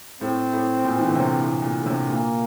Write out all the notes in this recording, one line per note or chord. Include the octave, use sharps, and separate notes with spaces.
A2 C4
A2
A#2
E3
D3
C3
A2
A#2
D3
C3
A#2 A#3